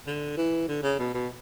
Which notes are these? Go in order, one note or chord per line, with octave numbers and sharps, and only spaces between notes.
D3
E3
D3
C#3
B2
B2